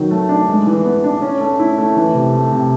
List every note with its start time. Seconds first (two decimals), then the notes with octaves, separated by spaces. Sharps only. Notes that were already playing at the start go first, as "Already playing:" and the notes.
Already playing: D#3 F#3
0.11 A3
0.29 D4
0.48 G#3
0.66 E3
0.85 B3
1.04 D4
1.22 C#4
1.41 A3
1.59 E4
1.78 A3
1.96 E3
2.14 C3
2.34 A3
2.52 C3